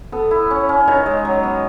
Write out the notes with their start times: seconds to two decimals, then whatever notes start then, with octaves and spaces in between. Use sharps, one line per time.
0.12 B3 A4
0.31 E4
0.51 C#4
0.69 C#4
0.88 D#3 C#5
1.06 G#3
1.25 F#3
1.43 B3